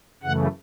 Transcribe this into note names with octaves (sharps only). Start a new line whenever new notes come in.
F#2 C#3 E3 A3 F#5